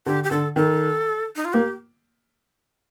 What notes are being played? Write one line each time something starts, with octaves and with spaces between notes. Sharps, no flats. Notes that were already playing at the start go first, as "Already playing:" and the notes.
D3 G4
G4
D3 A4
D#3 A4
D#4
F4
A#3 G4